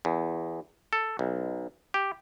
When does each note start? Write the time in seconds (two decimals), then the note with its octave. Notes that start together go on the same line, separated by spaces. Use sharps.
0.05 E2
0.93 A4
1.19 B1
1.94 G4